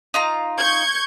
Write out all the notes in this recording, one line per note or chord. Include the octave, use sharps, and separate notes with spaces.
D#4 F4 A#5
C#6 G6 G#6